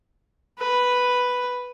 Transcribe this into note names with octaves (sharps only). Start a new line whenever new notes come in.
B4